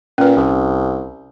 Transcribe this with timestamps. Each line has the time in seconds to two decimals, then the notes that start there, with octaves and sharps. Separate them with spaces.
0.18 A#2 C#4 B4
0.36 C2